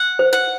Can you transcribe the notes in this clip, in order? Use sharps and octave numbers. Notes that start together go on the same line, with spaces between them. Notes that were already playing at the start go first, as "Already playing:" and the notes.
Already playing: F#5
C5
F#5